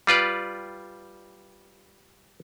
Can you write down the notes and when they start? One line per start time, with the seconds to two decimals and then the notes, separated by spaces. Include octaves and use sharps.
0.07 G3 F4 B4 D5